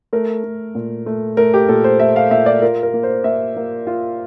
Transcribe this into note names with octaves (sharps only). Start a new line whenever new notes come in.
A3 A#4
A3
A#2
A3
A3 A#4
G4
A#2 A4
C5
A3 E5
F5
A#2 E5
D5
F4 A#4
A#4
A#3
C5
A#3 E5
A#3
F4